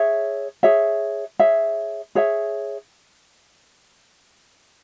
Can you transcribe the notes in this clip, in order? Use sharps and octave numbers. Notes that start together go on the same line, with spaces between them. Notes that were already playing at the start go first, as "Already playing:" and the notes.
Already playing: G#4 C#5 E5
G#4 C#5 E5
G#4 C#5 E5
G#4 C#5 E5